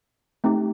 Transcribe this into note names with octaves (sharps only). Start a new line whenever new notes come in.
A3 C4 D#4 G4